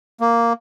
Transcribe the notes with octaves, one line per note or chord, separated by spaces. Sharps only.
A#3